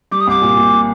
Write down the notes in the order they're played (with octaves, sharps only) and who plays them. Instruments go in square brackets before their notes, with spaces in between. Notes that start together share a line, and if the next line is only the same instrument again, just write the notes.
[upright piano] G3 [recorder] D6
[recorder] D#6
[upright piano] C2 [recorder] D6
[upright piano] A#2
A#2